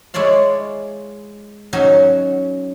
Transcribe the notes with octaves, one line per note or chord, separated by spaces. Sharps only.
G#3 E4 C#5 D5 F5
F#3 C#4 D#4 G#5